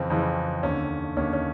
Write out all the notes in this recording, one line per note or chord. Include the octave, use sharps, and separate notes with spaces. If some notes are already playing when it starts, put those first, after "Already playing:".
Already playing: F2 C#3 E3 C4
F2 C#3 E3
D#2 D3 C#4
D#2 D3 C#4
C#4